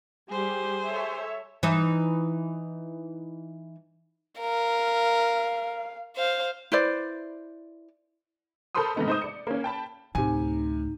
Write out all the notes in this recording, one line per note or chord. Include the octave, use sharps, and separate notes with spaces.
G3 G4 G#4 C5
A4 C#5 E5
E3 D#4 E5
A#4 F5
C5 F5
E4 B4 C5 D5
A4 A#4 C5 B5 C6 D#6
G#2 C3 G#3 A3 B3 D#4
D#4 C5 D#6
D5 C#7
A#3 C#4
G5 A5 B5
D2 A2 C3 D#4 G#5